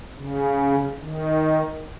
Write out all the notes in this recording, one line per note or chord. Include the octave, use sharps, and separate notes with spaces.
C#3
D#3